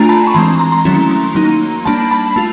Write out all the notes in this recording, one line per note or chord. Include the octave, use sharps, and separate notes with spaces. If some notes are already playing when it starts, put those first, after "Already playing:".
Already playing: A3 D4 F4 G#5 A#5
A5 B5
C#6
E3 G#3 C4 A#5 C6
A#5 C6
A#5 C6
D#3 F#3 A3 C#4 E4
F#3 A#3 D#4
G3 A#3 D4 A5 B5
A5 B5
A3 F4